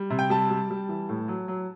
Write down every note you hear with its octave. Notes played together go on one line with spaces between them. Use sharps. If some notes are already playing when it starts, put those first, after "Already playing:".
Already playing: G3
C3
G5
G3 A5
G3
G3
E3
A2
F#3
F#3